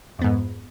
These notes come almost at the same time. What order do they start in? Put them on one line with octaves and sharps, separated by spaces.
F2 B3 G#2